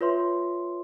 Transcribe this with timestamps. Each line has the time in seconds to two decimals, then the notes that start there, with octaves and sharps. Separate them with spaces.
0.01 F4 B4 C#5 E5 C6